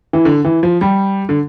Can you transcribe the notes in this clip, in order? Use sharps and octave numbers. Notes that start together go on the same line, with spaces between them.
E3
D3
E3
F3
G3
D3